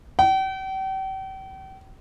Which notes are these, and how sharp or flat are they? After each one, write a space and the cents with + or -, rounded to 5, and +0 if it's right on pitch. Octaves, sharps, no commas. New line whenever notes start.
G5 -40